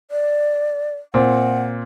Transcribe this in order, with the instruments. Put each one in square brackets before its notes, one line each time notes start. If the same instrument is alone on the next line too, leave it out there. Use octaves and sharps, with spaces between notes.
[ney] D5
[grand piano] A#2 C4 [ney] F#5